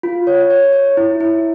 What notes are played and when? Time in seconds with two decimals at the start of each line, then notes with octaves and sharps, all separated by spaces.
0.03 F4
0.27 C#5
0.50 C#5
0.73 C#5
0.97 E4
1.20 E4